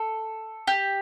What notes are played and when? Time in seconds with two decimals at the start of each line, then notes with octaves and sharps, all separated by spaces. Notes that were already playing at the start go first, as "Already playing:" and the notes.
Already playing: A4
0.67 G4